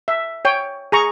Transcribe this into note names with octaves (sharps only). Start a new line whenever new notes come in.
E5
C#5 G5
G#4 A#5 C#6